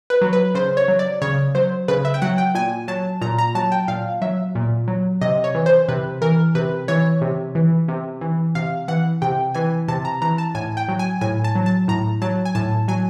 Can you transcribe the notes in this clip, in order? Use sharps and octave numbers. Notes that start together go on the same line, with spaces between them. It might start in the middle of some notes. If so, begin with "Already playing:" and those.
B4
F#3
B4
C#3 C5
C#5
F#3
D5
C#3 C#5
F#3 C5
C#3 B4
E5
G5
F#3 F#5
G5
A#2 G#5
F#3 A5
A#2 A#5
A#5
F#3 A5
G5
A#2 F5
F#3 E5
A#2
F#3
C3 D#5
C#5
E3
C5
C3 B4
E3 A#4
C3 B4
E3 C#5
C3
E3
C3
E3
C3 F5
E3 F#5
C3 G5
E3 G#5
C3 A5
A#5
E3 A#5
A5
A2 G#5
G5
F#3
G#5
A2 G#5
A5
F#3
A5
A2 A#5
F#3 A5
G#5
A2 A5
F#3 G#5